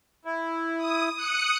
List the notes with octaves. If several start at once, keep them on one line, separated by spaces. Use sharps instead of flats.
E4
D#6
D#6 F#6 C#7